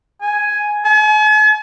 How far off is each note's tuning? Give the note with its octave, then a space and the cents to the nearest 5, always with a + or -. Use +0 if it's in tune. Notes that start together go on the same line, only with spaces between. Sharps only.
G#5 +5
G#5 +45